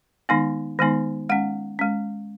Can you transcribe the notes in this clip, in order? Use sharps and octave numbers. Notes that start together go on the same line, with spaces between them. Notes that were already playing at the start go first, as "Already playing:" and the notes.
D#3 G#3 B3 D#4
D#3 G#3 B3 D#4
G#3 C#4 F#5
G#3 C#4